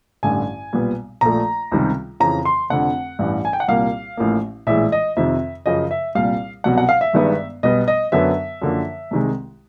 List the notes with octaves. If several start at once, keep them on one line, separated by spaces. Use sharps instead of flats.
A1 G2 D3 G#5
B1 A#2 G3 B3
A#1 A#2 F3 A3 A#5
C#2 C3 D#3 G3
F2 C#3 E3 A#5
C6
F1 F2 D3 F#5
A1 G2 E3
G#5
G5
F#5
C2 A#2 G3 A#3 F5
A1 A2 F3 A#3
A#1 A2 E3 G#3 E5
D#5
F2 C3 D#3 E5
F#2 C#3 F3 D#5
E5
C2 A#2 G3 F5
C2 B2 F#3 F#5
F#5
F5
E5
G1 G2 D#3 G#3 B3
B1 B2 G3 B3 D#5
D#5
F#2 D3 F#3 B3 E5
F#2 D3 F3 A#3
C2 C3 D#3 G#3